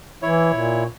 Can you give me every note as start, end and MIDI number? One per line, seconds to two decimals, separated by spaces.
0.22 0.54 52
0.22 0.84 64
0.22 0.84 73
0.54 0.85 46